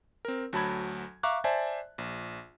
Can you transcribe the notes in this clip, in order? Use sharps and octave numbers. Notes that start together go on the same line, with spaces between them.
C4 A#4
D2 F#3 A5 B5 G#6
E5 F5 A#5 C#6 D6 F#6
C5 D5 E5 G#5 A5
A#1